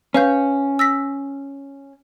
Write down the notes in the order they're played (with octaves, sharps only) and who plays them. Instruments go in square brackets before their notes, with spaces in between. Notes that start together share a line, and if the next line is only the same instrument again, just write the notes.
[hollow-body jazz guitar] C#4 [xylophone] B4 F5 G6
[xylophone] E6 A#6 B6